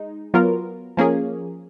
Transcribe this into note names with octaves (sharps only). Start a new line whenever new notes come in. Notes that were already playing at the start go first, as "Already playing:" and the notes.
Already playing: G#3 D#4
F#3 B3 F4 A#4
F3 A#3 C#4 G#4